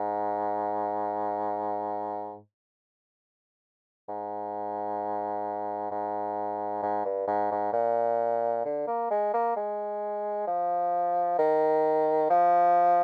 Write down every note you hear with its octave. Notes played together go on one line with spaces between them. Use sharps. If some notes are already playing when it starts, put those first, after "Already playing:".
Already playing: G#2
G#2
G#2
G#2
G2
G#2
G#2
A#2
D3
A#3
G#3
A#3
G#3
F3
D#3
F3